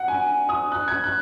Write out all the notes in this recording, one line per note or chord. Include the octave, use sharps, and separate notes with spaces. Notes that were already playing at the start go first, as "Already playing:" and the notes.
Already playing: F#5
G#5
D#6
F#6
G#6
F#6